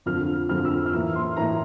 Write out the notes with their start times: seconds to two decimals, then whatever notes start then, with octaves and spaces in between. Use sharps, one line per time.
0.06 F2 D3 F3 F6
0.49 F2 D3 F3 F6
0.65 E6
0.86 F6
0.93 A2 E3 A#3 E4 E6
1.15 C6
1.37 A2 E3 A#3 E4 A#5